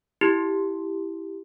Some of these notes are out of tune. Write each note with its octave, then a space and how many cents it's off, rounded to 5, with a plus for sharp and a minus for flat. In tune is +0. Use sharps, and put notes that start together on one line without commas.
E4 +0 G4 +0